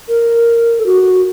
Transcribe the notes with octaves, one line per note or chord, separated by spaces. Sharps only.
A#4
A4
F#4